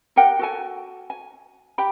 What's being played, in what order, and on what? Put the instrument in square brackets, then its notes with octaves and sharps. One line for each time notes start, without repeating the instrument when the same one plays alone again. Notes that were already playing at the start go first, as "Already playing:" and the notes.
[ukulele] G4 A#4 F#5 G5
F#4 A4 G#5
G#5
G4 G5 B5